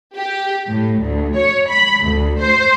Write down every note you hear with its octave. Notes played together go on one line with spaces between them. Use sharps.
G4
A2
D2
C#5
B5
D2
C5